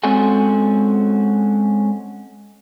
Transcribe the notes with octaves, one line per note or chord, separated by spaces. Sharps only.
G#3 C4 C#4 F#4 A4 G#5